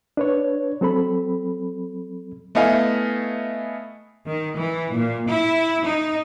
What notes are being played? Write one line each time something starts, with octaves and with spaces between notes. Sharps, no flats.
D4 B4 C#5
F#3 C4 A4 B5
A3 B3 E4 D#5 F5 G#5
D#3
E3
A#2
E4
D#4